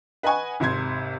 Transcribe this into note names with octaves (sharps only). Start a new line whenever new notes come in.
B4 D#5 F#5 G#5 C#6
G#1 C3 C6 G#6